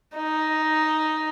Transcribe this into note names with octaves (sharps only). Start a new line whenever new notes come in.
D#4